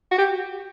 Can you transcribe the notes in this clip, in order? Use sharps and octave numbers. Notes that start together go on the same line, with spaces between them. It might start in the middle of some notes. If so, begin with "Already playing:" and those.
F#4
G4